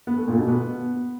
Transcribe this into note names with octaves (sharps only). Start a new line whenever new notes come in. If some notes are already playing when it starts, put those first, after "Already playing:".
B3
A3
A#2
B2
B3